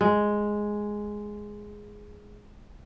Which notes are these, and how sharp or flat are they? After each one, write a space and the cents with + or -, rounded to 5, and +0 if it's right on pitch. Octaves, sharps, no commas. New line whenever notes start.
G#3 +0